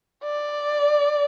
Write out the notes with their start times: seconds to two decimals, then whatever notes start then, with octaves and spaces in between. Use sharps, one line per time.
0.24 D5